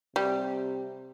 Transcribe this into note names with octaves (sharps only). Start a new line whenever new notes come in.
C3 G3